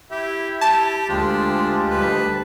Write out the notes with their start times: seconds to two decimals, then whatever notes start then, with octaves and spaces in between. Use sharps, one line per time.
0.11 E4 G4 E5
0.61 G4 A5
1.09 D2 G#3 D4 F4 G4
1.90 D2 G3 B4